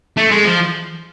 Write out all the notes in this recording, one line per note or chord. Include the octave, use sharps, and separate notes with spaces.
A3
G#3
F3